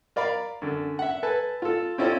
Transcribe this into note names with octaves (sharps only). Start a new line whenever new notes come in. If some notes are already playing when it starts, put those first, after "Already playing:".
A#4 D5 F5 B5
F#2 D3
E5 F#5
A4 B4 G#5 A5
F4 A4
C4 C#4 E4 F4 A4 D5